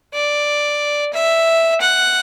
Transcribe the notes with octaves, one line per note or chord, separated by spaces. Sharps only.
D5
E5
F#5